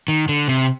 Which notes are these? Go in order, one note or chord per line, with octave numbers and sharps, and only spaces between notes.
D#3
D3
C3